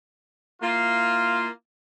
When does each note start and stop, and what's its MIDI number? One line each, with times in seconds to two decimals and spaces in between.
0.62 1.48 58
0.62 1.48 64
0.62 1.48 65